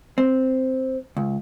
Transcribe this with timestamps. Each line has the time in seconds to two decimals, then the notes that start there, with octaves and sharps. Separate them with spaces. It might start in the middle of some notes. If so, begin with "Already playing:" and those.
0.18 C4
1.17 C#2